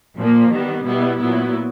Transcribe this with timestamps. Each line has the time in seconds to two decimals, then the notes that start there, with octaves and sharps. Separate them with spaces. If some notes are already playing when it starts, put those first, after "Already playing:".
0.17 A#2 F3 A#3
0.51 D#3 G3 B3
0.85 B2 G3 B3 E4
1.18 A#2 F#3 B3 E4